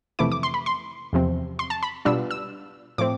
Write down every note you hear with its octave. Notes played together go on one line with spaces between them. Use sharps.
F2 C3 E3 A3 E4 D6
D6
C6
B5
C6
E2 C3 F3 C4
C6
A5
B5
B2 G3 B3 D4 F4 E6
E6
A2 F3 A3 C4 D6